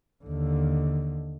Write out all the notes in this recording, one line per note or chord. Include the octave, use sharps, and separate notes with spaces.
D#2 D3